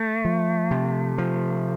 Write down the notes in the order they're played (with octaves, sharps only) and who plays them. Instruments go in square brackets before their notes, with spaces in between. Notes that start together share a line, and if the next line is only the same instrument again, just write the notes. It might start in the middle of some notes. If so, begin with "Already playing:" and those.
Already playing: [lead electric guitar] A3
[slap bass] F3
C3
F3